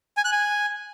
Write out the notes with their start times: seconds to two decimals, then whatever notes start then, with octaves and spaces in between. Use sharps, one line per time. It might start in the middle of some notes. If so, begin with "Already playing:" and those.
0.17 G#5
0.25 F#6
0.32 G#5